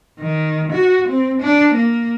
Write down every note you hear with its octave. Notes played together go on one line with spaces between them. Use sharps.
D#3
F#4
C4
D4
A#3